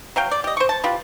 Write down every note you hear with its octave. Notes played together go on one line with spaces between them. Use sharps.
F#3 F5 G5
D5
G4 D#5
C5 C#6
A5
F4 G4 B4